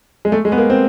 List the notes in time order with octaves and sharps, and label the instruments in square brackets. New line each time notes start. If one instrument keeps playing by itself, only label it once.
[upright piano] G#3
A3
G#3
B3
A#3
C4